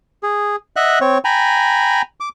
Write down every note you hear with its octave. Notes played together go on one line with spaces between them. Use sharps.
G#4
D#5 E5 F#5 F#6
C4 C#5
G5 G#5 A#5 B5
D6